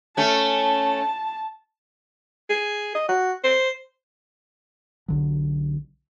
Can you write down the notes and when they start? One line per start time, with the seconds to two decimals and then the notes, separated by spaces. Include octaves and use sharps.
0.17 A3 C#4 A5
2.50 G#4
2.95 D#5
3.09 F#4
3.44 C5
5.08 B1 D3 F#3